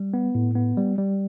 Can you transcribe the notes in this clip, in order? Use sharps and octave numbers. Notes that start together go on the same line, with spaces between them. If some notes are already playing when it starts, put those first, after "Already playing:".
Already playing: G3
B3
A2
B3
G3
G3